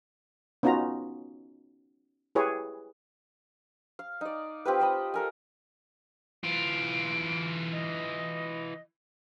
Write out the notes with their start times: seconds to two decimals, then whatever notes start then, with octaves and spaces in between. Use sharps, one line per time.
0.63 B3 C#4 D#4 F4 F#4 A#5
2.35 E4 G4 G#4 B4 C#5
3.99 F5
4.21 D#4 D5
4.65 C4 F4 G4 B4
4.80 C5 D#5 B5
5.14 A4 A#4 G#5
6.43 E3 F4 D7
7.72 D#5